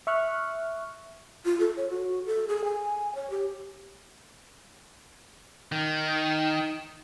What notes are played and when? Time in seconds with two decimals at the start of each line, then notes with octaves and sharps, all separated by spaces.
0.07 E5 C#6 F6 F#6
1.45 F4
1.60 A4
1.77 C#5
1.90 F#4
2.27 A4
2.48 G#4
2.64 G#5
3.15 C#5
3.30 G4
5.72 D#3